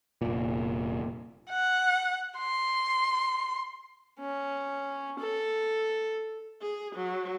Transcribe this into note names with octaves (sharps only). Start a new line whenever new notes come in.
F1 A#2
F#5
C6
C#4
A4
G#4
F#3